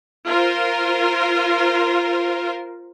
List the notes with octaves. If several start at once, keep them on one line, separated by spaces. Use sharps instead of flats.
F4 A#4 C5